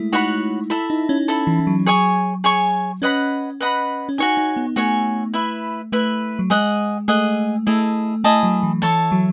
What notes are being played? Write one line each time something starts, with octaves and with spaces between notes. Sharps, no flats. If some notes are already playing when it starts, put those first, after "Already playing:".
Already playing: G#3 A3 E4
D#4 F#4 C#5 F#5 B5
E4 A4 E5 B5
D#4
C#4
A4 E5 B5
E3
E3
F#3
G#4 C#5 G#5 C#6
G#4 C#5 G#5 C#6
C#4 B4 D#5 F#5 B5
B4 D#5 F#5 B5
C#4
D#4 F#4 C#5 G#5
D#4
B3
A3 F#4 C#5 G#5
E4 B4 E5
A3 E4 B4 E5
F#3
G#3 G#4 D#5 F#5
A3 G#4 D#5 F#5
A3 E4 G#4 D#5 A5
A3 E4 G#4 D#5 A5
F#3
E3
E3 A4 C#5 E5 A5
F#3